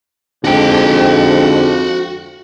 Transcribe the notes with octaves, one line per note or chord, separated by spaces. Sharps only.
F2 G#2 D3 F#4 G5